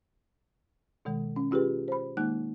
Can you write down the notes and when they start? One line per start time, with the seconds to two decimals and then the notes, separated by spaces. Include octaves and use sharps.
1.05 B2 D#3 G#3
1.36 C#4
1.51 C#4 F4 G4 G#4 B4
1.88 C5 B5
2.17 D#3 G#3 A#3 D#4 F#6